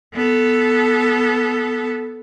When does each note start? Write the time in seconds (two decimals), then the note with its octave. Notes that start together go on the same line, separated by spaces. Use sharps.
0.14 B3 A4